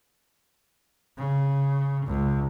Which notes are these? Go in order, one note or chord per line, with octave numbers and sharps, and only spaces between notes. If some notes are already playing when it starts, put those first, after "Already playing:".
C#3
C#2